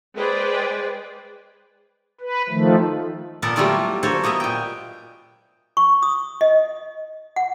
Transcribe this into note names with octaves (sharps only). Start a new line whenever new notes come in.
G#3 G#4 B4 C5 D5 G5
B4
D#3 F3 A3
A#2 B3 A4 A#4 D5
F#3 G3 A3 E4 F4 D5
A#3 F#4 A4 C5 C#5
A#3 B3 D#5 E5
A#2 G5
C#6
D#6
D#5
F#5